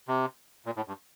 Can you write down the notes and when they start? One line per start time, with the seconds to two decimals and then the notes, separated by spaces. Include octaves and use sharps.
0.08 C3
0.66 A#2
0.76 A2
0.88 G2